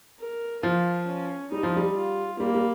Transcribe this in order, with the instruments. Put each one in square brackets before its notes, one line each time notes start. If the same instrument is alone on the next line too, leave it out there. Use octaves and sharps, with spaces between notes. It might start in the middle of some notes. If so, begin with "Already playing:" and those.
[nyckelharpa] A#4
[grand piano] F3 [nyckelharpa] F4
[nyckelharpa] C#4
[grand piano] G3 [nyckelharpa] D#4
[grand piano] F3
G3
[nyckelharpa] F4
[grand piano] G3 [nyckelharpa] A#3
[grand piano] G3